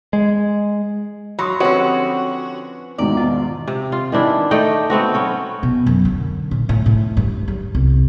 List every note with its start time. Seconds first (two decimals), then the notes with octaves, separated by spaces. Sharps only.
0.13 G#3
1.39 F#3 B5 C6 D#6
1.60 D3 F3 C4 C#4 F#4 G4 B4 C#5
2.98 E2 G#2 B2 D#3 D5
3.17 F4
3.68 C3
3.92 F4
4.12 D#3 E3 D4 E4
4.51 A3 D#4 D5 G5
4.90 A3 B3 C4 F#4
5.14 F#3 B3 C#4 G5
5.63 B2
5.86 F#2
6.05 D3
6.51 A#2
6.69 A2
6.86 A2
7.17 G2
7.48 G3
7.75 C2